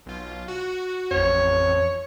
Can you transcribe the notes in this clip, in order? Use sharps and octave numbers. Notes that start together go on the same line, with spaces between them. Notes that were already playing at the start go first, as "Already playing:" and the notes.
B1 F4
F#4
A1 F2 C#5